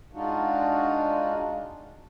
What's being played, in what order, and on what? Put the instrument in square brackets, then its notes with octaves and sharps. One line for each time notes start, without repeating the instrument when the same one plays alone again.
[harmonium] G#3 D4 D#4 F4 F#4